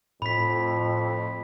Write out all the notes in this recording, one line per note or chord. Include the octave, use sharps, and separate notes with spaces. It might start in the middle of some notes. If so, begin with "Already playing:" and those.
F2 A2 B5 B6